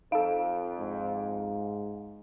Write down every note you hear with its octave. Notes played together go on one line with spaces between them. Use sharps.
F2 D#4 A4 F5
G#2